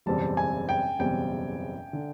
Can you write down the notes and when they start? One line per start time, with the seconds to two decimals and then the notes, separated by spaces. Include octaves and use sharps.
0.06 F#1 E2 B2 G3 C4 A5
0.37 G#5
0.69 G5
0.99 F#1 E2 B2 G3 C4 G5
1.93 D3